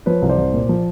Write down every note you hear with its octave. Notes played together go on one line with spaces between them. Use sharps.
F3 B4 C#5
C2
C5 D5
C2
A#2
F3